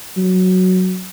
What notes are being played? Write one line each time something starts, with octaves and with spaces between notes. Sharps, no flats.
F#3